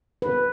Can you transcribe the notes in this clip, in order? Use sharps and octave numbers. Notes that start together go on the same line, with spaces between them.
B4